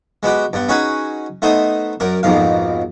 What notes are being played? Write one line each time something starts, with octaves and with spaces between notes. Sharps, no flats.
G#3 B3 F#4 G4
G2 B3
C#4 D#4 F#4 G#4 B4
A3 B3 D#4 C5 D#5
F#2 A#4 D5
A#1 F2 G#2 B2 F5